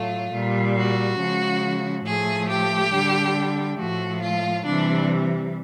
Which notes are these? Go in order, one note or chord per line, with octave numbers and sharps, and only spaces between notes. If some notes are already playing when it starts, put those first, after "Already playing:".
Already playing: A2 F#3 A3 F4
A#2 G3
F#4
C#3 F3 G#3
A2 F3 A3 G#4
G4
D3 G3
A2 F3 A3 F#4
F4
C3 E3 G3 D4